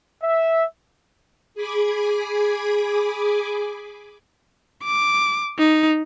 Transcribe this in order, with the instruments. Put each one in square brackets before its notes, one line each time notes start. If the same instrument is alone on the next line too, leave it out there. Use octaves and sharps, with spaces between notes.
[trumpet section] E5
[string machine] G#4 G#5 B5 D6
[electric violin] D6
D#4